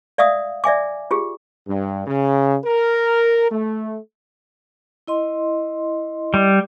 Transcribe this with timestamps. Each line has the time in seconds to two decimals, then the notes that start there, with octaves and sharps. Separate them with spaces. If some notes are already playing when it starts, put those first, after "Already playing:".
0.18 D5 E5 F5 D#6 E6
0.64 D5 E5 G#5 D6
1.11 F4 G4 G#4
1.68 G2
2.06 C#3
2.64 A#4
3.51 A3
5.07 E4 D#5 C6
6.34 G3